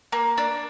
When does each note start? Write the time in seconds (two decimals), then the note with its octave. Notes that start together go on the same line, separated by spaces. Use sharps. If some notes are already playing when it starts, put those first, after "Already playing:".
0.12 A#3
0.38 D4